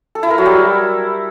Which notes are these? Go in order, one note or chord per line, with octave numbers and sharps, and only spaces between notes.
A4
E4
A#4
F#3
G3